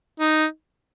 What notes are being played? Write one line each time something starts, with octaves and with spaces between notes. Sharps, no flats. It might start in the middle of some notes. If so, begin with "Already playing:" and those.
D#4